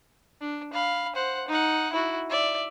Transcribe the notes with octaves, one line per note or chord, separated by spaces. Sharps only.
D4
F5 B5
C5 F#5
D#4 F#5
E4 F#4
D5 E5